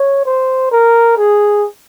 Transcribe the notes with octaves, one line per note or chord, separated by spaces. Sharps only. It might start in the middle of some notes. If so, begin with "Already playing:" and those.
Already playing: C#5
C5
A#4
G#4